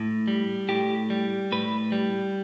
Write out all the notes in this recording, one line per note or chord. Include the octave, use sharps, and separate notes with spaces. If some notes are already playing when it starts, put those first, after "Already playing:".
Already playing: A2
G3
A2 G4
G3
A2 B4
G3